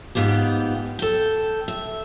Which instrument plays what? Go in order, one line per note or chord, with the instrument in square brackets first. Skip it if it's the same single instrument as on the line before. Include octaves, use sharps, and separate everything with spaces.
[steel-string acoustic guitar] G#2 B3 F4 G4
A4 G5
E5